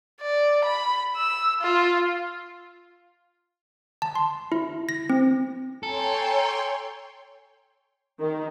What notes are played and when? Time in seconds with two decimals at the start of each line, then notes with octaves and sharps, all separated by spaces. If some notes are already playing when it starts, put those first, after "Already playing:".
0.21 D5
0.65 B5
1.17 E6
1.62 F4
4.02 A5
4.15 C6
4.52 E4
4.89 A#6
5.10 C4
5.83 A4 C#5 G5 G#5 A#5 C6
8.21 D#3